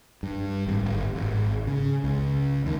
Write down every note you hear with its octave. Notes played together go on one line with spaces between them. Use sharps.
G2
G#1
G1
G#1
C#3
C#2
D#2